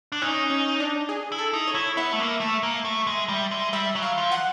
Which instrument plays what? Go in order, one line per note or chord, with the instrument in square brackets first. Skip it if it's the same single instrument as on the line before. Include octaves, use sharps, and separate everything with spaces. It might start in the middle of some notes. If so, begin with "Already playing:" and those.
[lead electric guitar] D4
[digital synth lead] C#4 [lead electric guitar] D#4
[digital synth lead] C#4
D4
G#4
[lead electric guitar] E4
[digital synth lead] A4
[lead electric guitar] D#4
[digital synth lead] C#5
[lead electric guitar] E4
[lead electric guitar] B3 [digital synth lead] E5
[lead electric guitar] A3
A#3
A3
A#3
A3
G#3
G3
G#3
[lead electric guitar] G3 [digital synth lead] E5
[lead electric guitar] F#3
[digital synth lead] F5
[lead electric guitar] F3
[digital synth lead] F#5